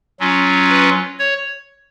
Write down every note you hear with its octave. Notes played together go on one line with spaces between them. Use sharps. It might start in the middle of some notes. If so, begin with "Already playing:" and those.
F#3 C#4 F4
B4
C#5